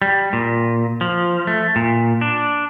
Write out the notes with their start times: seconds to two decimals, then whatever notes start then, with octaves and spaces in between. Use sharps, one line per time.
0.02 G3
0.33 A#2
1.01 F3
1.47 A3
1.76 A#2
2.21 D4